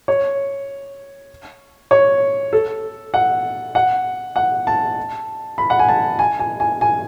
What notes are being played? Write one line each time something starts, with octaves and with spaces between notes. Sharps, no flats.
C#5
C#5
A4
F#5
F#5
F#5
A5
B5
F#5
G#5
A5
G#5
G#5
G#5
G#5